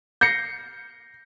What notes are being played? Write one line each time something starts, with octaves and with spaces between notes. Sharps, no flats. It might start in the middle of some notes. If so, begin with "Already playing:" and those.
G6 A#6 C7 C#7